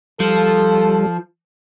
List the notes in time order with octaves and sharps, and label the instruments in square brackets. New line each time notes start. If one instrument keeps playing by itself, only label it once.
[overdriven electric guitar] F3 [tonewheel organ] G3 [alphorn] A4